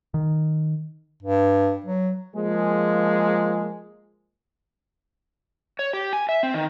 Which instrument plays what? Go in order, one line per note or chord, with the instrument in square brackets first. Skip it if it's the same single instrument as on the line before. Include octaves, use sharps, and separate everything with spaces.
[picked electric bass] D#3
[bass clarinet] G2
F#3
[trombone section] F3 G#3 A#3 G#4
[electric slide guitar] C#5
G4
G#5
E5
C4
D#3